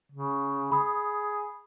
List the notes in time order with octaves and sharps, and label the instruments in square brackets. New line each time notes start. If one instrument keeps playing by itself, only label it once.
[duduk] C#3
[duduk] G#4 [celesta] B5 D#6